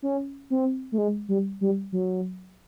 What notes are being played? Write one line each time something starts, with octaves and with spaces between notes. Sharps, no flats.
C#4
C4
A3
G#3
G3
G3
F#3